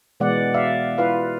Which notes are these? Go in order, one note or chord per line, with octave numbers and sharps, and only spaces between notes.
B2 E3 G#3 B3 D5 F#5
D5 E5 F5
E4 F4 B4 F5